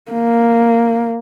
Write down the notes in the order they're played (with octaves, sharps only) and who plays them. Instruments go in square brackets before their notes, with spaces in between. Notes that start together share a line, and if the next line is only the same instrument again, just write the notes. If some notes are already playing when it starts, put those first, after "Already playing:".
[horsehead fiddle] A#3